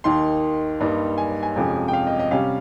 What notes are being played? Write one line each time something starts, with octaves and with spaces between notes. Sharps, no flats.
D#2 D#3 A#3 D#4 C6
G2 G3 A#3 D#4
G#5
G#5
F2 C3 F3 G#3 C#4
G5
F5
D#5
D#5
C3 G3 C#4 F5